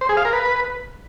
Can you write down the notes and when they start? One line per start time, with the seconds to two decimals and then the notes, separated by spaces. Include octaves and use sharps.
0.01 C5
0.09 G#4
0.17 F5
0.25 A#4
0.33 B4